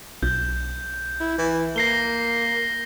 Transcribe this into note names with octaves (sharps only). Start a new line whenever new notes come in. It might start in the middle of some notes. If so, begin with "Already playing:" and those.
B1 G6
E4
E3
A#3 A#6 C7 G7